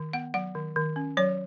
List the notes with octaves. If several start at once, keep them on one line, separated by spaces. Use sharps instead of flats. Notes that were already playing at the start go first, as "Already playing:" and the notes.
Already playing: D#3
B3 F#5
F#3 F#5
D#3
D#3
C#4
F#3 C#5